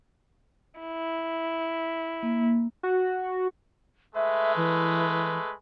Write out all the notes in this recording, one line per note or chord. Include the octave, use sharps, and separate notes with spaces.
E4
A#3
F#4
G#3 A3 B4 E5
E3